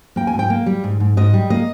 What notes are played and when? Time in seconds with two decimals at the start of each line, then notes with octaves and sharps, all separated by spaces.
0.16 A#3 G5
0.27 G#5
0.33 G#2
0.39 G5
0.50 A#3
0.66 G3
0.84 G#2
1.00 G#2
1.17 G#2 D#5
1.34 G3
1.50 A#3 D#5